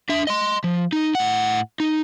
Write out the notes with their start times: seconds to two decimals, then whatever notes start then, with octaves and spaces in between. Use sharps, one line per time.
0.09 D4 E5
0.27 D#5 C6
0.64 F3
0.93 D#4
1.15 A2 F#5
1.80 D#4